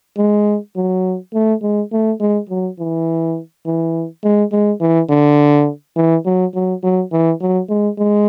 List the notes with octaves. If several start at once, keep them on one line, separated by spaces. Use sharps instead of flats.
G#3
F#3
A3
G#3
A3
G#3
F#3
E3
E3
G#3
G#3
E3
D3
E3
F#3
F#3
F#3
E3
F#3
G#3
G#3